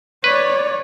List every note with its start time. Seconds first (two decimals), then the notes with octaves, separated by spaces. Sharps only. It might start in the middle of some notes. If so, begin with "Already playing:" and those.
0.24 B4 C#5 D5